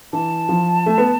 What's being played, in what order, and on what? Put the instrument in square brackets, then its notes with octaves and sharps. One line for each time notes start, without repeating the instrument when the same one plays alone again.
[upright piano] E3 [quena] A5
[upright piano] F3
A3
B3